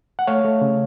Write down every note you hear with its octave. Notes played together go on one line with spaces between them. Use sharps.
F#5
A3 C#5 F5
A3
C#3